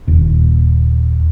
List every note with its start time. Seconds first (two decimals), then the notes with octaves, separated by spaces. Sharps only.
0.07 D#1